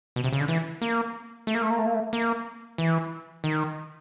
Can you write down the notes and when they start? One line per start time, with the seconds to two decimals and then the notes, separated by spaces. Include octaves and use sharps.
0.16 B2
0.24 C3
0.32 C#3
0.40 D3
0.48 E3
0.82 A#3
1.47 A3
1.55 A#3
1.62 A3
1.70 A#3
1.79 A3
1.86 A#3
1.94 A3
2.13 A#3
2.78 E3
3.44 D#3